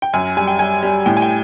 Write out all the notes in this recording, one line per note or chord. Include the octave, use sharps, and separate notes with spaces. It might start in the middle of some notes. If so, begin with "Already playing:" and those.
G5
F#2 G#5
G3 G#5
G5
G3 G#5
G3
A2 G5
G#5
G5